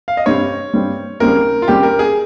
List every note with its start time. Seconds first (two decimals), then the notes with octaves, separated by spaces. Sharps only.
0.08 F5
0.17 D#5
0.26 G2 G3 C4 C#5
0.74 G2 G3 C4
1.20 D#2 C#3 G3 C4 A#4
1.62 F4
1.67 D#2 C#3 G3 C4 G4
1.83 A#4
1.99 G#4